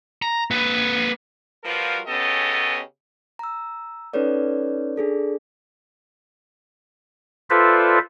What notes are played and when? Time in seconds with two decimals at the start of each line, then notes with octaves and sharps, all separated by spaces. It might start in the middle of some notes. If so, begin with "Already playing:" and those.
0.22 A#5
0.51 A#3 B4
1.64 F3 G3 F4 F#4 A#4 B4
2.07 C#3 B3 C#4 G4 A4 D#5
3.39 A#5 E6
4.13 C#4 D#4 A4 B4 C#5 D5
4.96 D4 G#4 A4 D5
7.50 F4 A4 B4 C5 D5 E5